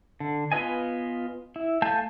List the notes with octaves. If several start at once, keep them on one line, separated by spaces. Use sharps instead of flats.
D3
B3 F4 B4 D#5 G#5
E4
A3 F5 G#5 A5 G6